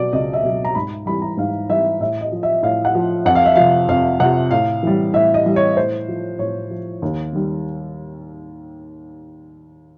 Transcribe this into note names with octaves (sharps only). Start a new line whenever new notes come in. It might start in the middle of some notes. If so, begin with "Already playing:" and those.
Already playing: B2 F#3 D5
C#2 D#5
E5
B2 F#3
A#5
G#2 B5
E3 G3 B5
A#5
G#2 F5
E3 G3 E5
A2 E5
D#5
F3
E5
A2 F5
F#5
F3
F2 F#5
F5
E5
C3 F3 F5
F2 F5
C3 F3 F#5
A2 F5
E3 G3
A2 E5
D#5
E3 G3
C#5
A2 C5
F3
A2 C#5
F3
D#2
D#3 G3